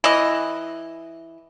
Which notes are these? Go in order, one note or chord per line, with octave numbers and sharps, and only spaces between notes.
E3 D#5